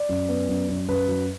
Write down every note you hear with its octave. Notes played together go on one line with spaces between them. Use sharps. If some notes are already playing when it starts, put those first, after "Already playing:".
Already playing: D5
F#2
B3
F#2
F#2
F#2 B4
F#3